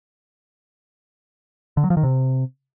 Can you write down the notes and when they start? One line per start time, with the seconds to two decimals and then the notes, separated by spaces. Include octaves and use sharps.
1.77 D3
1.84 F#3
1.90 F3
1.97 D#3
2.03 C3